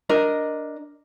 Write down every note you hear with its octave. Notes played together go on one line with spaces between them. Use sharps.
D4 A#4 D#5